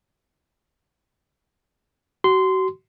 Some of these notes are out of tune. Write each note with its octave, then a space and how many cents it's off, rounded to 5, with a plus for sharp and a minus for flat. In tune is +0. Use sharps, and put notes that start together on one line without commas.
F#4 +35 C6 -15